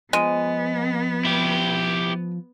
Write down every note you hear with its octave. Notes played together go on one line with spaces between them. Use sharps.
F3 G#3 B3
E4 G4